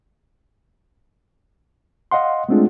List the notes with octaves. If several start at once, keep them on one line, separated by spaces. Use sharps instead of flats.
D#5 F5 F#5 C6
G#3 A3 C4 D4 F4 G#4